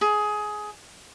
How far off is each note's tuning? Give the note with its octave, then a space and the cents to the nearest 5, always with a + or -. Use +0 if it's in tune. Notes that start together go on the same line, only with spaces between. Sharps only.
G#4 +15